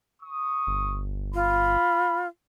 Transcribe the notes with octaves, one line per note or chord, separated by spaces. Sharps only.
C#6 D#6
G1
F4 B5